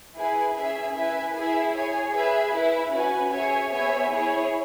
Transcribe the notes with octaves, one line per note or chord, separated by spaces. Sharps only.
E4 G#4 B4 G#5
C#4 G#4 E5 G#5
E4 B4 E5 G#5
E4 G#4 E5 G#5
G#4 C#5 G#5
G#4 B4 E5 G#5
E4 B4 E5
C#4 F#4 B4 G#5
G#4 C#5 E5 G#5
B3 G#4 C#5 E5 G#5
E4 G#4 C#5